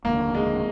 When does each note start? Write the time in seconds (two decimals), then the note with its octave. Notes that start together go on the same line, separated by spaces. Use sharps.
0.05 F1 D#2 D3 A#3
0.35 G#3